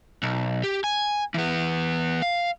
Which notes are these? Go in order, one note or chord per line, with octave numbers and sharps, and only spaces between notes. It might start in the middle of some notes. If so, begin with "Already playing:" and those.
B1
G4
G#5
E3 B3
F5